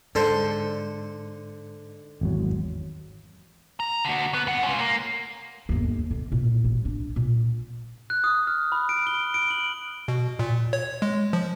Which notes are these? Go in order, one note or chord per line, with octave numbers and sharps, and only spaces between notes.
G#2 D3 A4 C5
G#1 E2 F#3
A#5
D3 F#4
B3
G2 F#5
C#4 F4
A#3
G1 D#2
D3
A#2 E4
A1
D4
A#2
F#6
D#6
F6
B5
D7
G7
D7
F#7
B2
A#2
C#5
G#3
F3